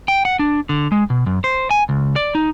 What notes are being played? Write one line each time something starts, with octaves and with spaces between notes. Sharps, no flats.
G5
F#5
D4
D3
G#3
B2
F#2
C5
G#5
C#2
D5
D#4